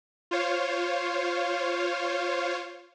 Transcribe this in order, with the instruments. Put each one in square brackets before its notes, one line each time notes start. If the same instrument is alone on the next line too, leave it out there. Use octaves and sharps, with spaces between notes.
[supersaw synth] F4 C5 C#5 F5